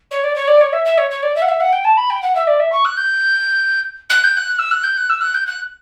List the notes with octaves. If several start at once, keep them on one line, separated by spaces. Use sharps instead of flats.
C#5
D5
C#5
D5
C#5
E5
E5
C#5
C#5
D5
E5
F#5
E5
F#5
G5
A5
B5
G5
F#5
E5
D5
E5
C#6
F#6
G6
F#6
G6
F#6
E6
F#6
G6
F#6
E6
F#6
G6
F#6